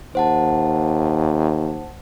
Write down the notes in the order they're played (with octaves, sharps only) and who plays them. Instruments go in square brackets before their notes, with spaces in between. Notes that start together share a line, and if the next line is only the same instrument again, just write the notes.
[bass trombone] D#2 [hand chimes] C5 F#5 A5